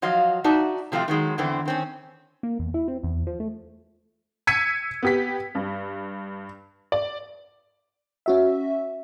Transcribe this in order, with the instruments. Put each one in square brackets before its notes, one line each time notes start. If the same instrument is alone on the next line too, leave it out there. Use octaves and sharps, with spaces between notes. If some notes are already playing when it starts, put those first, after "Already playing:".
[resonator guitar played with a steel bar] F3 F#3 D#5 F5
D#4 F#4 D5 E5 A5
C3 F3 A3 C4 F4
D#3 F#3 G#3
E2 D3 E3 C4
D#3 C4 C#4
[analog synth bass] A#3
E2
E4
C4
E2
F3
A3
[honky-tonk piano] E6 G#6 B6 C#7 D#7
B3 G4 B6
G2
D5
[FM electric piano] C#4 F#4 E5